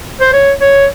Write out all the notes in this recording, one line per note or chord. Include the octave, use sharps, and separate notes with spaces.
C5
C#5
C#5